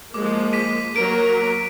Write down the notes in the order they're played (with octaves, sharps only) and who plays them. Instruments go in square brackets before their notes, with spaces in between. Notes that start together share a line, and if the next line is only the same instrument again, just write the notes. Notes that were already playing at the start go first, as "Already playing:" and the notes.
[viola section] F3 G#3 A#3 [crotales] D6
[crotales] D6 B6 D#7
[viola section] F#3 A#3 A#4 [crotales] D7